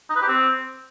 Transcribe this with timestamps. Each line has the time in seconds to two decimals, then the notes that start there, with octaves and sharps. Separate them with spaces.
0.10 D#4
0.16 B4
0.22 G4
0.28 C4